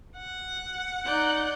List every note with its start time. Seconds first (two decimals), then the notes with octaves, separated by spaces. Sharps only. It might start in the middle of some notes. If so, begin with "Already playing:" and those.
0.17 F#5
1.05 D#4 D5 F#6 G6